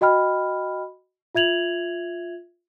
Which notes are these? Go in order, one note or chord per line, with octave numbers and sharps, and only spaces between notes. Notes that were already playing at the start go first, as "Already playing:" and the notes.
F#4 D#5 G5 B5 F6
F4 E5 G#6 F7 F#7